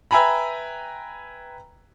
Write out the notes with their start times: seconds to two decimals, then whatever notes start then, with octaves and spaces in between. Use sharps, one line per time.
0.11 B4 E5 G5 G#5 A#5 B5